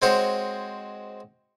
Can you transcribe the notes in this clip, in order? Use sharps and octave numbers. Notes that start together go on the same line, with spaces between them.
G#3 C4 F#4 C5 C#5